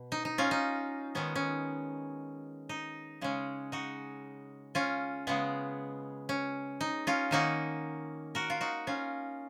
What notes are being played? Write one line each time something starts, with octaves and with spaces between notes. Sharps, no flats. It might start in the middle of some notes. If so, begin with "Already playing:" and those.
Already playing: B2
D#4
D#4
C#4 F4
D#4
D#3 G#3 B3 C#4
C#4
D#4
C#3 G#3 C#4
D#4 F#4
C#4 F4
C#3 G#3 B3
C#4
D#4
C#4 F4
D#3 A#3 C#4 D#4 F#4
F#4 A#4
F4
D#4 F#4
C#4 F4